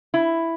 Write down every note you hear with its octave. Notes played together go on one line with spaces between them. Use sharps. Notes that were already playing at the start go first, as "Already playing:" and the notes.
E4